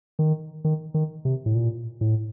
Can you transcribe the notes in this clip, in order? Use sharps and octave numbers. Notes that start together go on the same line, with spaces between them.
D#3
D#3
D#3
C3
A2
A#2
A2